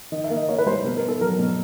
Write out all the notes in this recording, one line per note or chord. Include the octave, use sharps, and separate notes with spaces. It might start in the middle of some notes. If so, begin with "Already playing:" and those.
D#3 D#5
E5
A#3
D#5
A#3 C#5
B4
G3 C5
B2 A#4
A#4
B3
A4
F#3 A#4
B2